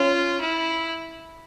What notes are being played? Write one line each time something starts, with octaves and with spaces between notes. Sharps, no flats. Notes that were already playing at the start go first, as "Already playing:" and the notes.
Already playing: C#4 F4
E4